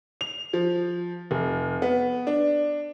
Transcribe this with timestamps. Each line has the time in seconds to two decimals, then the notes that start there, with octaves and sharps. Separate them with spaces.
0.21 F7
0.53 F3
1.31 F1
1.82 B3
2.27 D4